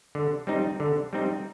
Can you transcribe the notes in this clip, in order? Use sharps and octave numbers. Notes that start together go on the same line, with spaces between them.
D3
G3 C4 D#4
D3
G3 C4 D#4